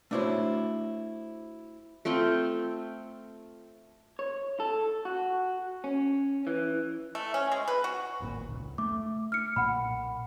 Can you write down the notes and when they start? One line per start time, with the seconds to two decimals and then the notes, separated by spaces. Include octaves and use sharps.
0.11 A3 D4 E4 F#4 C5 C#5
2.05 A3 C4 F4 G5
4.19 C#5
4.60 A4
5.05 F#4
5.84 C#4
6.47 E3
7.15 A3
7.34 C#4
7.52 G#3
7.68 B4
7.84 F#4
8.20 D1 G#1 A#2
8.47 F1 C#2
8.78 A3 D6
9.32 F6 C#7
9.56 B1 A#2 F#5 B5